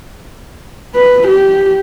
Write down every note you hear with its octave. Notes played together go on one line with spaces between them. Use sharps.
B4
G4